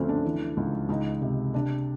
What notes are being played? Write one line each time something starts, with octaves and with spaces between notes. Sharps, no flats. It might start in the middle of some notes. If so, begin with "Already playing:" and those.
Already playing: D2 F3 C4 C#4
D4
E3
C#2
C#2 D#4
C3
C3 D4